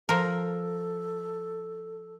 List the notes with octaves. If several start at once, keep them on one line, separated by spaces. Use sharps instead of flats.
F3 A4 A#4